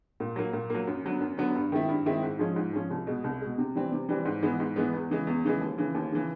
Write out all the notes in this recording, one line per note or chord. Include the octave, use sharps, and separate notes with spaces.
A#2
F#3 A#3
A#2
F#3 A#3
F#2
D3 F#3 B3
F#2
D3 F#3 B3
G2
D#3 G#3 C4 E4
G2
D#3 G#3 C4 E4
G#2
F3 G#3 C#4
G#2
F3 G#3 C#4
C2
B2 G#3
C2
B2 G#3
C3
E3 G3 C4
C3
E3 G3 C4
G#2
E3 G#3 B3
G#2
E3 G#3 B3
E2
C#3 E3 G#3
E2
C#3 E3 G#3
D#2
C#3 E3
D#2
C#3 E3